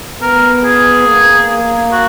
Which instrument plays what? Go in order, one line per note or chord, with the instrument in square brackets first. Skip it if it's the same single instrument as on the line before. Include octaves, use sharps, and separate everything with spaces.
[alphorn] B3 [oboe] A#4
[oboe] G#4
[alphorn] A#3
[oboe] F#4